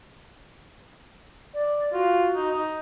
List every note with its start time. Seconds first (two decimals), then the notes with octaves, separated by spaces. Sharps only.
1.54 D5
1.93 F4 F#4
2.35 D#4
2.51 D#4